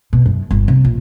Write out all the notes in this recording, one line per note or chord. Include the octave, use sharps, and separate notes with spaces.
B2
F#2
G1
C3
A#1